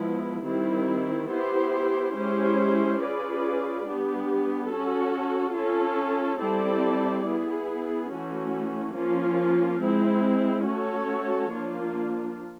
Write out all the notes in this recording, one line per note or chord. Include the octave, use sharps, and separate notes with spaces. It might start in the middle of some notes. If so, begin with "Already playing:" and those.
Already playing: F3 G#3 B3 E4
D#3 G3 C4 E4
B3 E4 G4 C5
G#3 C#4 E4 G4 C5
C#4 F4 G#4 B4 D5
G3 B3 D4 G4
C#4 F#4 A4
C#4 F4 A4
G3 C4 E4 A4 D5
B3 E4 G#4
E3 A3 C#4 F#4
F3 A#3 C#4 F4
G#3 C4 E4
A3 C#4 F#4 A4 C#5
F3 A#3 D4 F4